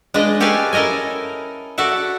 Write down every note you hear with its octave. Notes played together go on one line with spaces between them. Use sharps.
G#3 D4 F4 B4 D#5
C#4 G4 A4 B4 F5 G#5
E4 A4 A#4 D#5 G#5
F#4 A4 D5 E5 F#5